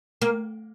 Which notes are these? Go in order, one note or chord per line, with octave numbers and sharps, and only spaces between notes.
A#3